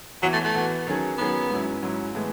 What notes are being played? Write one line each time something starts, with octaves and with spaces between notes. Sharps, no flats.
E3 F#3 B3 F#4
A3
A3
E3 B3 F#4
D#3 F#3 C#4 G#4
D#3 F#3 B3 C#4 G#4
G#2 F#3 C#4 E4
G#2 F#3 C#4 E4
A2 E3 G#3 B3